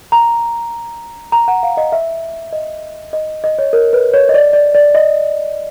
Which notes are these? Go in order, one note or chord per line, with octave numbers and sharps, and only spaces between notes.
A#5
A#5
F#5
F5
D#5
E5
D#5
D#5
D#5
C#5
A#4
B4
C#5
D#5
D5
D5
D5
D#5